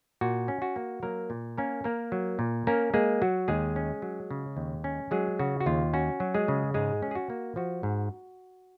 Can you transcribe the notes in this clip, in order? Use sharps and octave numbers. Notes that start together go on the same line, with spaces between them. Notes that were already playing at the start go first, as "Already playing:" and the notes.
A#2 F#4
C#4
F#4
A#3
F#3 A#3 A#4
A#2
A#3 C#4 A#4
A#3 A#4
F#3
A#2
A#3 C#4 A#4
G#3 A#3 G#4
F#3 F#4
D#2 G#3 G#4
C#4
F#3
C#3
D#2
C#4
F#3 G#3 G#4
C#3 F#4
F#4
D#2 F4
C#4 F#4
F#3
G#3 G#4
C#3
G#2 G#3 G#4
C#4
G#4
F#4
A#3
F3 F#4
G#2